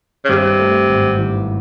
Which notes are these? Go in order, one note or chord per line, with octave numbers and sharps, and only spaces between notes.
C#3
G2 C3
A3
G#1
E3